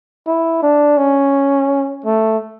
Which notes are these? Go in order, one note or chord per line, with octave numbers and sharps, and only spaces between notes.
E4
D4
C#4
A3